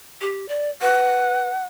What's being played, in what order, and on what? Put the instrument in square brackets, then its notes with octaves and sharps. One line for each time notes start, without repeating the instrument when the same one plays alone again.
[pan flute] G4
D5
[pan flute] B4 [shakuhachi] F#5